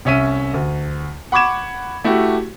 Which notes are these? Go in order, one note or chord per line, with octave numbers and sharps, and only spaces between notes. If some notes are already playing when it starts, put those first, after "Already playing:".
C2 C#4 E5 D#7
D2
F#5 B5 C#6 D6 G#6 E7
A3 E4 F#4 G4